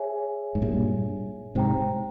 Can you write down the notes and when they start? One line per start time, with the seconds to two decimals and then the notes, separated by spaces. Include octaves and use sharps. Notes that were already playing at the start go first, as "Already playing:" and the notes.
Already playing: G#4 C#5 E5 G#5
0.55 G#2
0.62 G2 A#2
1.55 G#2 C3 C5 G5 A#5